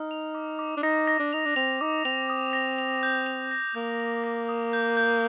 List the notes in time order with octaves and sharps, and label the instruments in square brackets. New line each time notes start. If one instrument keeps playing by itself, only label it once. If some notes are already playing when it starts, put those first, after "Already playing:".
Already playing: [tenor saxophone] D#4 [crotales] F6
[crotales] F7
D6
D6
[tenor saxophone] D4
[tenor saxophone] D#4 [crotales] A#6
[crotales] A#6
[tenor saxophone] D4
[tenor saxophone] D#4 [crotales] F7
[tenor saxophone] D4
[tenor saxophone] C4 [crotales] F7
[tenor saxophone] D#4 [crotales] D6
[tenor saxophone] C4 [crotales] F7
[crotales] D#6
A#6
F7
G6
F7
A#6
[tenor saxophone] A#3 [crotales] G6
[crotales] F7
A#6
D#6
G6
G6